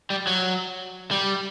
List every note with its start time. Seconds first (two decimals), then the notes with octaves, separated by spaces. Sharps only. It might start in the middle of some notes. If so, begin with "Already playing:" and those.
0.10 G3
0.27 F#3
1.11 G3